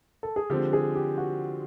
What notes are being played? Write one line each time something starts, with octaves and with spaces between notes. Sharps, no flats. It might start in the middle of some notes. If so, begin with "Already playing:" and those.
A4
G#4
D3 F3 G#3 C4 G4
G#4
G4
F#4